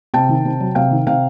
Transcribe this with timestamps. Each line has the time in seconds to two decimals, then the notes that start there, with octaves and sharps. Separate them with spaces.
0.14 C3 G5 A5
0.29 D#3
0.45 C3
0.60 F#3
0.75 C3 F5 G5
0.91 D#3
1.07 C3 F5 G5